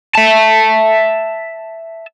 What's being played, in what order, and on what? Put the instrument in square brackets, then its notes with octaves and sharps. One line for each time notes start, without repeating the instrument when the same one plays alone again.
[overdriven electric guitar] E5 A5